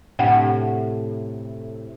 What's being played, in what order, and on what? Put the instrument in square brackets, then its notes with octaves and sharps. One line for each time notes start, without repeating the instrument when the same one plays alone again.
[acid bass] A2 [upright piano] C3 [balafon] D4 F#5 G5